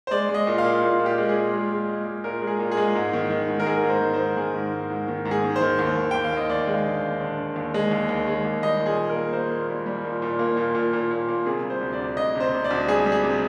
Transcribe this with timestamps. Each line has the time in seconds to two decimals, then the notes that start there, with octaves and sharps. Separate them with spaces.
0.07 C5
0.11 G#3 D5
0.29 G#3
0.34 D#5
0.47 A#2
0.58 F5
0.64 A#2
0.82 A#2
1.00 A#2
1.06 G4
1.18 G#3
1.29 G#4
1.36 A#2
1.53 G#3
1.71 G#3
1.89 G#3
2.06 G#3
2.24 A#2 A#4
2.42 G#3
2.47 G#4
2.59 A#2
2.72 G#4
2.77 G#3
2.95 G#2
3.13 D#3
3.30 D#3
3.48 G#2
3.60 A#4
3.65 G#2 G#4
3.84 G#2
3.89 C5
4.01 D#3
4.14 G#2 C5
4.37 D#3 G#4
4.54 G#2
4.73 G#2
4.90 G#2
5.08 D#3
5.25 G#2
5.31 G#4
5.44 D#3
5.56 C5
5.61 D#3
5.79 D#2
5.96 D#2
6.11 D#2 G5
6.24 F5
6.32 D#2 D#5
6.49 D#2 D5
6.67 G#3
6.74 F5
6.86 D3
7.03 D#2
7.20 D3
7.38 D3
7.56 D#2
7.74 G#3
7.91 D#2
8.09 D#2
8.27 G#3
8.44 D#2
8.62 G3 D#5
8.80 A#2
8.86 G#4
8.98 A#2
9.09 A#4
9.15 A#3
9.33 A#3 C5
9.51 A#2
9.69 G3
9.86 G3
10.05 A#2
10.22 A#2
10.39 A#3
10.57 A#2
10.75 A#2
10.93 A#2
11.11 A#2
11.29 A#3
11.46 C3 G#4
11.64 G3
11.70 C5
11.81 D2
11.93 D5
11.99 D2
12.17 D2 D#5
12.35 C3
12.40 C5
12.53 C3
12.64 D5
12.71 D2
12.88 G3 G#4
13.06 G3
13.12 G#4
13.24 C3